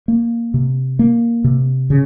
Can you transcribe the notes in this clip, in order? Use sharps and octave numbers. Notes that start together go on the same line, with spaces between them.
A#3
C3
A#3
C3
C#3